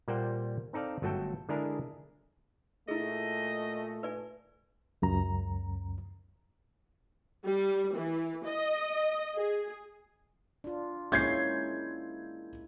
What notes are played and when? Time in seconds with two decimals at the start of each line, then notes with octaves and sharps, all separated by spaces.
0.08 A#2 G3 A#3 C5 F#5 G5
0.73 C4 D#4 A4 D5 F5
1.02 G1 F#3 A3 F#4 A4 G5
1.49 D3 G#3 D4 E4 G#4 A#4
2.88 A#2 A3 E4 G#4 D#5
4.03 B4 D5 G#5
5.02 C#2 F#2 A#5
7.45 G3
7.95 E3
8.46 D#5
9.36 G#4
10.64 D4 F4
11.12 G#3 A#3 C#4 E4 G6 G#6 C7